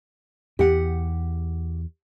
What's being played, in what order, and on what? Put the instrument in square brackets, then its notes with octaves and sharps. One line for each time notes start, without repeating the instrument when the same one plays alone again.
[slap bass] E2 [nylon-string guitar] G4 F#5